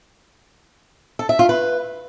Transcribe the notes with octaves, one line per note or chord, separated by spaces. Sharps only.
A4
E5
F4
B4